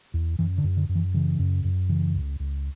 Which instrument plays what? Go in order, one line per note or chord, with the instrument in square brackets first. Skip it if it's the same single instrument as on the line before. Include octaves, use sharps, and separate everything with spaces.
[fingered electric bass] E2
F#2 E3
D3
F#2
D3
F#2
E3
C#3 E3
F#2
F#2
C#3 E3
C#2
C#2